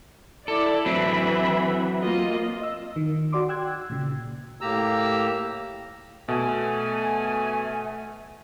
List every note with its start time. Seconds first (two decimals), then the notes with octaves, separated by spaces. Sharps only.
0.48 E4 A4 D5
0.86 E3 F#3 C4 E5 B5
2.02 A#3 F4 D#5
2.61 D#5 E6
2.96 D#3
3.32 F#4 D5 C6 D6
3.49 G5 E6 F#6 G#6
3.90 A#2 C#3
4.61 A2 A#3 G4 A#5 E6
6.28 B2 A3 G#5